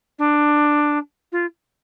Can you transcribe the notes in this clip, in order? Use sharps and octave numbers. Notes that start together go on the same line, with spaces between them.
D4
F4